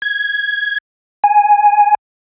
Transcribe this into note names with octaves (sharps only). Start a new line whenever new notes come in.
G#6
G#5